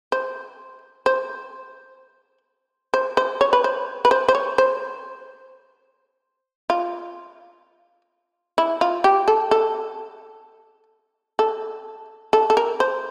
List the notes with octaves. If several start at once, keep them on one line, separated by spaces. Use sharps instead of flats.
C5
C5
C5
C5
C#5
B4
C5
B4
C5
C5
C#5
C5
F4
E4
F4
G4
A4
A4
A4
A4
A4
A#4
C5